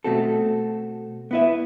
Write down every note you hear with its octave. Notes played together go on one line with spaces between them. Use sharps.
B2 A3 C4 F#4 A4
B3 E4 B4 E5